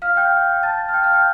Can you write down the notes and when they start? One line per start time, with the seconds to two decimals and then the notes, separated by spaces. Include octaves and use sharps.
0.02 F5 F6
0.17 G5 G6
0.63 A5 A6
0.89 F6
0.93 G5 G6
1.04 F5 F6
1.14 G5 G6